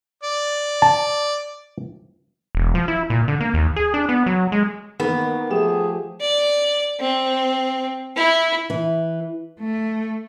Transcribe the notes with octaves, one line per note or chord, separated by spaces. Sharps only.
D5
A5
E1
F3
E4
A#2
D3
A#3
D#2
G#4
D4
B3
F#3
G#3
D#3 A#3 B3
F3 A3 G4 G#4 E7
D5
C4
E4
E3
A3